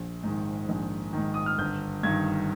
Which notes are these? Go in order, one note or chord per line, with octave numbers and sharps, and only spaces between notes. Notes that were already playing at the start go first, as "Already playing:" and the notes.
Already playing: A#1
G#2 D#3
A#1
G#2 D#3
D#6
F6
G1 G6
G2 D#3 G#6